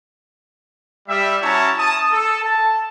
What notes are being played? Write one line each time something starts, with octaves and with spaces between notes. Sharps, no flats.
G3 E5
C#4 E4 F#4 C#5 A5 A#5
A5 D#6
A4
A5